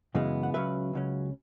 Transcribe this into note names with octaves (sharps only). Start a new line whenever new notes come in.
F#2 C#3 E3 G#3 B3
F#5
C#2 C#3 F#3 C#4 B4 E5
C#2 C#3 F#3 C#4